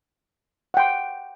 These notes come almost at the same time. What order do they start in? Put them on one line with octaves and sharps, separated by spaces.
F#5 G5 C6